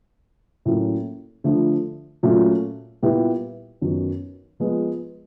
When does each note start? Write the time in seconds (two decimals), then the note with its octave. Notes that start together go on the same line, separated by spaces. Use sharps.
0.65 A2 F#3 A#3 C#4
1.44 D3 F3 A3
2.23 A#2 F#3 A3 C#4
3.02 A#2 G3 B3 E4 G4
3.82 F#2 D#3 F#3 B3
4.60 F3 G#3 B3